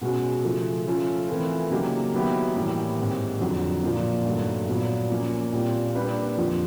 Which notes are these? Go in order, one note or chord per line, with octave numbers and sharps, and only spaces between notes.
B2 G#3 C#4 F#4
C#3 F3 A3
F3 A3 C#4 F4 A4
E3 A3 C4 F4 A#4
C#3 F#3 A#3 D#4 G4
D#3 F#3 B3 E4 G4
A2 E3 G3 A#3
G#2 D#3 G3 C4
F2 D3 F#3
A#2 F3 A#3
G2 D#3 F#3 A3
A#2 F#3 B3
F3 A#3 C#4
A#2 G3 C4 F4
G3 A#3 D4 G4 B4
F2 D3 F3